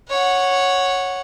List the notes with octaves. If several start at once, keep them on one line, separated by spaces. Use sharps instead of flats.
C#5 F#5